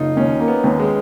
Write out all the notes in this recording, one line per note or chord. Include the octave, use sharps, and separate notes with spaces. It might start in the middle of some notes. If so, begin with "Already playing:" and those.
Already playing: F#1 D#4 F4
D#2 C#4
A#3
B3
D#2
G#3